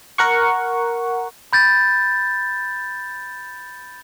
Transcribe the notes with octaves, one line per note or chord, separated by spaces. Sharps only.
A#4 F#5 C#6
B5 G6 A6